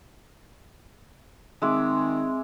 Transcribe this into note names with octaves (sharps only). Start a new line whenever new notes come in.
D#3 G#3 C4 E5 D6